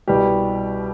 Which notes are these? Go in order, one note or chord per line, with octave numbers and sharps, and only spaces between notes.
C2 B2 G3 G4